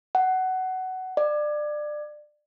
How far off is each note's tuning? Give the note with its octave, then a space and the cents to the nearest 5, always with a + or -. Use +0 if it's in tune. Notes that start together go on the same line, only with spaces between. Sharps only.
F#5 +15
D5 +25